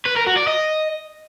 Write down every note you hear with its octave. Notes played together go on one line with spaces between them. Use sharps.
B4
A#4
F#4
D5
D#5